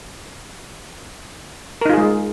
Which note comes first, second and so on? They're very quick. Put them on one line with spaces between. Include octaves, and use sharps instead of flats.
A#4 D#4 F4 G#4 G#3